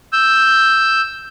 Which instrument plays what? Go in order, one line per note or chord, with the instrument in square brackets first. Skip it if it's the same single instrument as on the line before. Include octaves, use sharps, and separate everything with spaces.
[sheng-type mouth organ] E6 G6